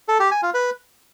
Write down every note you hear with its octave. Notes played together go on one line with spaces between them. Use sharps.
A4
G4
G#5
F4
B4